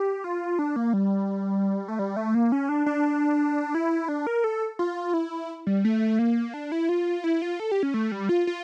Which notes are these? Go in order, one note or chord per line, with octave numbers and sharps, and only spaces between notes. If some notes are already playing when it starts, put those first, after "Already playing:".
Already playing: G4
F4
D4
A#3
G3
A3
G3
A3
A#3
C#4
D4
D4
E4
D4
A#4
A4
F4
E4
G3
A3
A#3
D4
E4
F4
E4
F4
A4
G4
C#4
A3
G3
F4
F4